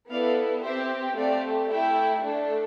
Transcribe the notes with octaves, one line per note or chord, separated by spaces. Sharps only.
B3 E4 A4 D5 F5
C4 G4 C5 E5
A3 C4 G4 D5 F5
A3 E4 G4 E5 G5
A3 D4 A4